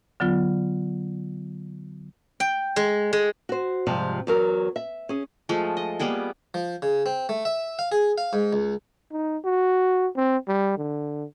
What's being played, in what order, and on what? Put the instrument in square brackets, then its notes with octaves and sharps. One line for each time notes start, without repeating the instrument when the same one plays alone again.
[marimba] D3 F#3 B3 F4
[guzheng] G5
G#3
G#3
[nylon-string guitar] F#4 C5
G#2 C3 F3 G3
E2 F#3 A#4
E5
C#4 G#4
[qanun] F3 G#3 A3
D#5
G3 A#3 B3 G#4
[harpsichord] F3
C#3
C4
A3
E5
F5
G#4
F5
G#2
C#2
[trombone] D#4
F#4
C4
G3
D3